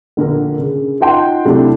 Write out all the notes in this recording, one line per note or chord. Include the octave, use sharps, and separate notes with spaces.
A#1 D3 A#4
C#3
D#4 F4 F#5 G5 C6
C3 F#3 A3 D4 E4